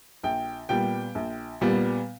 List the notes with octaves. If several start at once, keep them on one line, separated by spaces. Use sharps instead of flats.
A#1 G5
A#2 G3 B3 G5
A#1
A#2 G3 B3